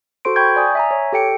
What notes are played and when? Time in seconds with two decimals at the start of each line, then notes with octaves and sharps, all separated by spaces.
0.25 F#4 A4 C5 C6 D7
0.36 G5 B5 C#6 G6 G#6
0.56 D5 G#5 D#6
0.75 E5 G#5 A#5
0.91 C#5
1.13 G4 A4 G5 C#7 D7